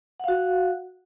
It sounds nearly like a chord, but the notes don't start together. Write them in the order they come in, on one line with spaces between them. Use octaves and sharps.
F#5 F5 F#4